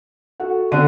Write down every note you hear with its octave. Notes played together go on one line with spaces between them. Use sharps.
F#4 A4 F#5
D3 C4 D5 D#7